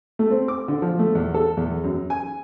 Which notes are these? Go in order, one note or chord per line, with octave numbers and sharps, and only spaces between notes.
A3
C4
D6
D3
F3
A3
E2
A4
E2
F#2
G#5